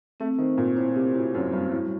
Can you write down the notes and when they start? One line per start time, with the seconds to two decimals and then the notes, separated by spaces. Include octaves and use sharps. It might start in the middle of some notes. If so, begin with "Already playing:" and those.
0.20 A3 C4
0.38 D#3 C5
0.58 A#2 C4
0.76 A2 C5
0.95 C3 C4
1.15 A2 F#4
1.34 F#2 F#4
1.53 G2 F#4
1.71 A2 G3